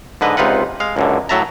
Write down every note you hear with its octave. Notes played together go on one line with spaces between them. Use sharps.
G#2 D3 B4 D#5
C#2 C3 D#4 F4 B4 F#5
G#3 F5
C#2 F#2 D3
A2 F#3 E5 A5 A#5